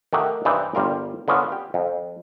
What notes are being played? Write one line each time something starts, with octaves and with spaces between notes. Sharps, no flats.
D#3 A3 G4 F#5
G2 E3 D#4 B4 C5 D5
G1 G3 F4 A#4
D3 B3 C#4 F4
G4
F2